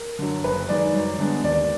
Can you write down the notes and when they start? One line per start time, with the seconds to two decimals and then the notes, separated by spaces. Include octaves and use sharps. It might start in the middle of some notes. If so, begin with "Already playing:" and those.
Already playing: A#4
0.19 F#2 D3
0.44 F#1 B4
0.69 F#2 D#3 G#3 D5
0.94 F#2
1.19 D3 G#3 B3
1.44 D#2 D5